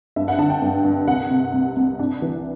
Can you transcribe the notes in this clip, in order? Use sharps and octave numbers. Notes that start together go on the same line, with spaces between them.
G2 E5
F#5
D3 A5
G5
G2
G2
C2 F#5
C3
C2
C2
D4
E3